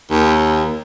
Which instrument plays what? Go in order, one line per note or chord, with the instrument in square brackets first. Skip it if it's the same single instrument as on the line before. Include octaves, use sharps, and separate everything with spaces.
[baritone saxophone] D#2